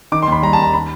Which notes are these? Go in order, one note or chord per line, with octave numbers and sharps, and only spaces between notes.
D#3 D6
C6
D#2 B5
G3 A#5
A5
D#2 A#5
B5